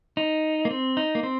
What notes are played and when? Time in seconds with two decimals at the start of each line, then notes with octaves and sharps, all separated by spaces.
0.17 D#4
0.65 A#3
0.71 C4
0.97 D#4
1.15 A#3
1.23 C4